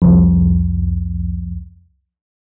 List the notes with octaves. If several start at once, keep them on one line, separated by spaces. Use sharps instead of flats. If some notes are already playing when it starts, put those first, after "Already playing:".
C2 F2